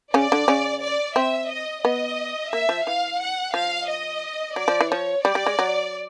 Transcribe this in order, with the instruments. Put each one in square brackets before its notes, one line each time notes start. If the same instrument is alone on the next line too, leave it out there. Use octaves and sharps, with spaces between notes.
[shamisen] C#3 C#4 [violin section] D5
[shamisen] D3 D4
C#3 C#4
[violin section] D5
[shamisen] C4 [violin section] E5
[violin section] D#5
[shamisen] B3 [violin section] D#5
[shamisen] A#3 [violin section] E5
[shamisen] F3
[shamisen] E3 [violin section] F5
[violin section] F#5
[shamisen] F3 [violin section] F5
[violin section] D#5
[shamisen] F#3 [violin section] D5
[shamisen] F3
E3
[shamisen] F3 [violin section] C#5
[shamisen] G3 [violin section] D5
[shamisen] G3
G#3
F#3